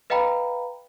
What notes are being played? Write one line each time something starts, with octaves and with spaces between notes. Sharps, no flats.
B4 D#5 F5 G5 A#5 B5